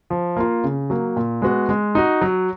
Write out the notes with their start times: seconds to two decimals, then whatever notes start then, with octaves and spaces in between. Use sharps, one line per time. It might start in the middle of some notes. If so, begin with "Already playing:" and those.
0.10 F3
0.37 A#3 F4
0.64 C#3
0.90 F#3 A#3
1.16 A#2
1.42 G#3 B3 F#4
1.69 G#3
1.95 D#4 F#4
2.21 F#3